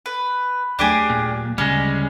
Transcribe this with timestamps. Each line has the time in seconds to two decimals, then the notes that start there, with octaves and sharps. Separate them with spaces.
0.06 B4
0.79 D#2 F#3 A3 D4 G4 G#4
1.10 A#2
1.58 D2 C#3 G3 G#3 C#4